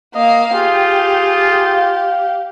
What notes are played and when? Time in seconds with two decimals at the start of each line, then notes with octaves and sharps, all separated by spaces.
0.15 A#3 D#5 F5
0.54 F4 G4 G#4
1.73 F5